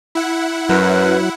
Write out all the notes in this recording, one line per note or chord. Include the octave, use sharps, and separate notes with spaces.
E4 F#5
F#2 F#3 B4